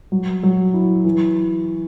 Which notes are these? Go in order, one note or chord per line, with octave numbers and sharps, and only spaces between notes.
F#3
F#3
E4
E3